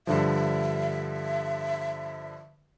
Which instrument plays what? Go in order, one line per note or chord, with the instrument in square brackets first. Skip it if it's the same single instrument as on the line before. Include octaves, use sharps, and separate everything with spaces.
[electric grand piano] G2 D3 F3 [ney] E5